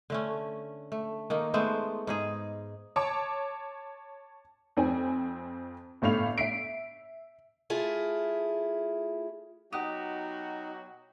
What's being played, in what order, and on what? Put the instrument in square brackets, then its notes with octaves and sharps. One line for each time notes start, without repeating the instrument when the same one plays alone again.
[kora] D3 A3 C#4
A3
D#3 A#3 D#4
G#3 A3 B3 C5
G#2 D#4 G#4
[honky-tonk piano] C#5 A5 D6
F2 C4 G#5
G1 A2 A3 F5 F7
E5 B6 C7 D7
[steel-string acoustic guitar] A3 E4 F4 G#4
[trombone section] B2 F#3 F#4 [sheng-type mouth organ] D#4 [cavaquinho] G4 [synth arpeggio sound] D#5 F#5 D#6